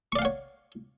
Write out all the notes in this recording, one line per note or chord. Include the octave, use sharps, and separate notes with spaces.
C#5 D5 F5 F#5 C#6